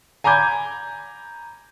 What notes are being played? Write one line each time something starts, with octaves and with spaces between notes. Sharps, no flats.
G#5 A#5 B5 D6 G6 G#6